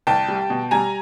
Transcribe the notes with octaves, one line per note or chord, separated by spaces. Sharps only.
C2 G5 A5
G3
B2
G3 G#5 A#5